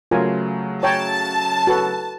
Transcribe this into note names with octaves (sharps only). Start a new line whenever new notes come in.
C#3 F#3 A3 F4 A#4 G#5
C#5 G5 A5 A#5
F#4 A4 B4